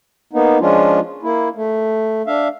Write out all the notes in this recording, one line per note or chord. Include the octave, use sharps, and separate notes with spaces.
A#3 B3 D#4
F3 G#3 C#4 D4 F4
A#3 E4
A3
D4 E5 F5